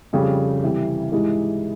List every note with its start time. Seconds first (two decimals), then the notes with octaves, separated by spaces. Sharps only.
0.13 F2 C#3 G3
0.63 C3 E3 G3
1.12 G#2 E3 G#3 E4 G4